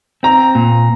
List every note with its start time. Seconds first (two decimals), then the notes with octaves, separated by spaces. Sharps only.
0.23 C4 A#5
0.55 A#2